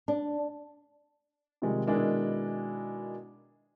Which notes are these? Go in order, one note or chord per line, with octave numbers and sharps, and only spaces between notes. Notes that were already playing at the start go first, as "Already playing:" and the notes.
D4
C3 D#3 F3 G3 G#3
B2 D#3 G#3 D4 E4 A#4